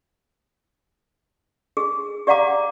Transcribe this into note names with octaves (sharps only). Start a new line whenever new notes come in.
G#4
G4 D5 F5 F#5 A#5 D6